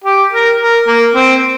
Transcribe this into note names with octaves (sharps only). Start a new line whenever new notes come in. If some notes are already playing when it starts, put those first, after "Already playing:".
G4
A#4
A#4
A#3
C4